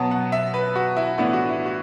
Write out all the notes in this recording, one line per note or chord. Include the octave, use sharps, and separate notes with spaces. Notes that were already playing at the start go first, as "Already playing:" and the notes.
Already playing: B2 F#3 B3 A5
F#5
E5
B4
F#4
E4
A2 E3 B3 D4 E4
F#4
E4
F#4